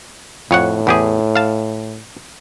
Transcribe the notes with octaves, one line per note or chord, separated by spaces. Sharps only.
F2 A2 C#5 F#5
E2 G4 G#4
F5 A5